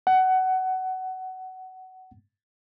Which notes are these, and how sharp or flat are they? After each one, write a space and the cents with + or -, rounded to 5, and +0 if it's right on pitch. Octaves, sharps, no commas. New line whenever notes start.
F#5 +20